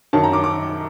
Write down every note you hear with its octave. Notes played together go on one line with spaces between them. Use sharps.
F#2 D#3 F#3 A5
A#5
D6
D6